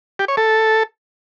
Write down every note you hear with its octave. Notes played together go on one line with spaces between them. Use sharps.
G4
C#5
A4